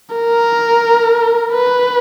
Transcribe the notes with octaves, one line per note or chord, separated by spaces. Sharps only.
A#4
B4